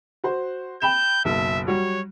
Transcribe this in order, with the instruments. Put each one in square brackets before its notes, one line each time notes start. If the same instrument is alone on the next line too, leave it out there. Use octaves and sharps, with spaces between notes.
[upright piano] F#4 C5
[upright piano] G5 B5 E7 [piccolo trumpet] G6
[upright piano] F#1 B1 [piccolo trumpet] E5
[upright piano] F#3 G3 F#4 [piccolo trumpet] C#5